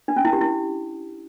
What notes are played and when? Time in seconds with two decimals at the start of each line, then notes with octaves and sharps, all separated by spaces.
0.08 D4
0.16 C#4
0.25 E4
0.33 G4
0.41 E4